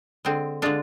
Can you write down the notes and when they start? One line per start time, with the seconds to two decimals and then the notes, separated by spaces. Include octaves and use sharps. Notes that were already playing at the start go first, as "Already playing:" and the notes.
0.25 D3 G#3 C4
0.62 D3 G#3 D4 F4